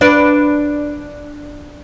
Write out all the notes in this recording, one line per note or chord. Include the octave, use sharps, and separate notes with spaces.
D4 B4 D5